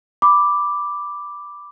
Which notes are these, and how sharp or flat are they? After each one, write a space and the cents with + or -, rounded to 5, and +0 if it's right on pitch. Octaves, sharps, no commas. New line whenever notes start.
B5 +0 D6 +0